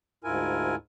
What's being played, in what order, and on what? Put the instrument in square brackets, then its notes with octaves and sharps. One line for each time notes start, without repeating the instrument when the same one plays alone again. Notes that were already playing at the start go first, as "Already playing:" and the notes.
[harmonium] D2 G#2 E4 F4 A#4 G#5